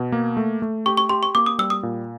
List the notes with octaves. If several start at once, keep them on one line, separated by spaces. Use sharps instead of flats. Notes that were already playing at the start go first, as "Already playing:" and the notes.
Already playing: B2
A#3
A3
A3
G4 C#6
C#6
G4 C6
C#6
A#3 D6
D#6
G3 E6
D#6
A#2